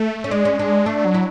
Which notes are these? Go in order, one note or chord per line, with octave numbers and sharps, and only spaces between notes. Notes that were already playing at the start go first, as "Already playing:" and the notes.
Already playing: A3
C#4
G#3 D4
C#4
D4
A3 D4
F#3
E4